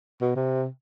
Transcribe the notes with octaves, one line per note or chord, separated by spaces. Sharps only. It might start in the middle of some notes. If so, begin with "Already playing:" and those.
B2
C3